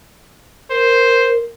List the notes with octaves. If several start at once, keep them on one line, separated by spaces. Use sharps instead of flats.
A#4 C5